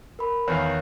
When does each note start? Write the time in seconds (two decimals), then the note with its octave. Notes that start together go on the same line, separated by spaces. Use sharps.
0.19 A#4 B5
0.48 E2 D#3 C#5 F5